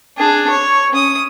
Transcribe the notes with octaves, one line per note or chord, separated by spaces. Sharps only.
D4 G#4
C#5
C#4 D#6